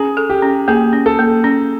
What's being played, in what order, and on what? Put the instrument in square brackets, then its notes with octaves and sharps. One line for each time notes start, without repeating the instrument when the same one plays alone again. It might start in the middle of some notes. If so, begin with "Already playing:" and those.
Already playing: [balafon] C#4 [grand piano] G#4
[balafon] A4
[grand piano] G4
[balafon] C#4
[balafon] A#3 [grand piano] G#4
[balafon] C#4
[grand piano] A4
[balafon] A#3
C#4